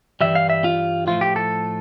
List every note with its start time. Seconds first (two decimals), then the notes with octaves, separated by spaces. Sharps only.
0.21 G2 E3 G3 E5
0.35 F5
0.50 E5
0.64 F4
1.07 A2 F3 A3 F4
1.21 G4
1.36 A4